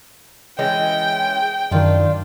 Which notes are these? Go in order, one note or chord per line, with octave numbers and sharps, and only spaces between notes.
E3 G#3 C#4 G5
F#2 D#3 D4 F4